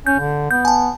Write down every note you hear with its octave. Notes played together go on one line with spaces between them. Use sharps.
C#4 G6
D3
B3 G6
G#5 A5